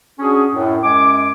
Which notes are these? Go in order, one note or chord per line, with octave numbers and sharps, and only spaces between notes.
C#4 D4 F#4 G#4
F#2 A2
F#2 G#3 G#5 D6